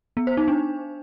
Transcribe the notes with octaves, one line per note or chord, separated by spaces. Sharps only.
B3
C5
D#4
D4